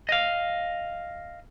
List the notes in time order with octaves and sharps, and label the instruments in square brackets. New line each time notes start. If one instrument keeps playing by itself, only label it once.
[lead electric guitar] D#5 F5